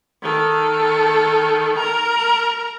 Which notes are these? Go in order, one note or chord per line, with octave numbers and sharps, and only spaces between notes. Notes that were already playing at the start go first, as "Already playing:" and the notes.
D#3 A4
A#4 A#5